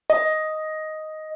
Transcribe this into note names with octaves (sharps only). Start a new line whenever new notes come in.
D#5